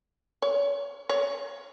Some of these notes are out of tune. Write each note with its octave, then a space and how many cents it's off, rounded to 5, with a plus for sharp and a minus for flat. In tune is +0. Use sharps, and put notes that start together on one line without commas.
C#5 +35
C#5 +30